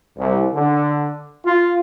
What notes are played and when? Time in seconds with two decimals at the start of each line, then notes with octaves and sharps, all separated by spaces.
0.18 C2
0.54 D3
1.46 F4